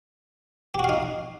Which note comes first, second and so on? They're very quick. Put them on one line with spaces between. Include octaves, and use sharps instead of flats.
G4 F#4 F5 D#4